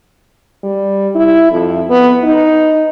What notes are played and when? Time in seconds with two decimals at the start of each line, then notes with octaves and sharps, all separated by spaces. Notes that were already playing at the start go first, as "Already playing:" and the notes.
0.64 G3
1.15 E4
1.52 F2
1.90 B3
2.24 D#4